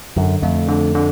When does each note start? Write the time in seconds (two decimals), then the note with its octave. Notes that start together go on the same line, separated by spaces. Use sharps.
0.17 F#2 D3
0.42 F2 A3
0.68 D3
0.95 D3